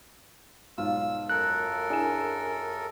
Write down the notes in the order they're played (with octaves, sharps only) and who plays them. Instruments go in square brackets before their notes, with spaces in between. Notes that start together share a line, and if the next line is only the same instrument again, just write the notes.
[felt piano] B1 G#2 F5 [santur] F4 [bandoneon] E6
[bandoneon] F#2 A4 A#4 [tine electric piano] F#6
[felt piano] D4 E4 E7 [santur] G#4